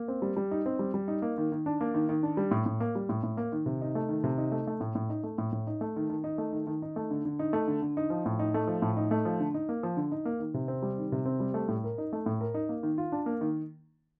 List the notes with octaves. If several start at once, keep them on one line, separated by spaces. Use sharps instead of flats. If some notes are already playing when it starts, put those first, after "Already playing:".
Already playing: A#3
C4
G3
G3
D#4
C4
G3
G3
D#4
A#3
D#3
D#3
D4
A#3
D#3
D#3
D4
G3
A2
A2
A#3
G3
A2
A2
A#3
D#3
C3
D#4
A3
D#3
C3
D#4
A3
A3
A2
A2
D#4
A3
A2
A2
D#4
A3
D#3
D#3
D#4
A3
D#3
D#3
D#4
A3
D3
D3
D#4
A3
D3
D3
D#4
F3
A2
D#4
A3
F3
A2
D#4
A3
F3
D3
D#4
A#3
F3
D3
D#4
A#3
D#3
C3
C4
G3
D#3
C3
C4
G3
A3
A2
A#4
D#4
A3
A2
A#4
D#4
A#3
D#3
F4
D4
A#3
D#3